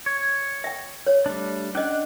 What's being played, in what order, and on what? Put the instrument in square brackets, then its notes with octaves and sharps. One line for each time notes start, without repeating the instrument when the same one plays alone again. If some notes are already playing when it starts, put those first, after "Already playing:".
[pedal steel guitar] C#5
[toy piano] E5 G5
C#5
[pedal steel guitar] G3 A3 D4
[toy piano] C#4 D#5 [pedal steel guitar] D4 F#5 G5